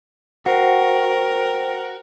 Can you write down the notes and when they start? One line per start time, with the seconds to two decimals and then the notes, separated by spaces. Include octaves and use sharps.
0.46 F#4 A#4 C5 G5